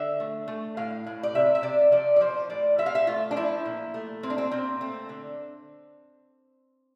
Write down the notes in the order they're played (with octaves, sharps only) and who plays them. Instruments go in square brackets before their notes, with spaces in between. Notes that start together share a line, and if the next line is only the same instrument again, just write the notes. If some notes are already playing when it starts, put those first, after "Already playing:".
Already playing: [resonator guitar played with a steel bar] D3 E5
A3
A3
A2 F5
A2
D5
C3 E5
E5
C3 D5
F3 D5
D5
F3 C5
A2 D5
F3 E5
F5
E5
A3 F4
D4
F3 E4
A#2
A3
A#2 C4
D4
C4
A#2 C4
A3 C4
D3